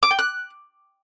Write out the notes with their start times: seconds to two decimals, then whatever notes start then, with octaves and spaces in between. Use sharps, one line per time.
0.03 D6
0.11 G5
0.19 F#6